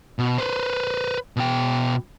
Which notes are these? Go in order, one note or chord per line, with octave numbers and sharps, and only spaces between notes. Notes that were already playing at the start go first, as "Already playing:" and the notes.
B2
B4 C5
B2 G5